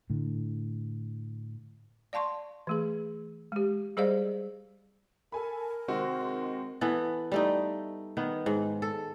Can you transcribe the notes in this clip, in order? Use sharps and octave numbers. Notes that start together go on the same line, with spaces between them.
A2 D3
D5 F5 A5 C6 C#6
E3 A3 G#4
G#3 G4
G3 G#4 C5 D5 D#5 F5
A4 A#4 G#5 B5
C3 D#3 G#3 C4 F#4
E3 B3 A4
G3 A3 D#4
D#3 B3
G#2
A4